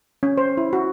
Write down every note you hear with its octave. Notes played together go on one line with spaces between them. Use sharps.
C#4
C5
E4
F#4